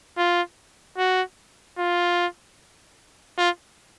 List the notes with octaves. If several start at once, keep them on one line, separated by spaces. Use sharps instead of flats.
F4
F#4
F4
F4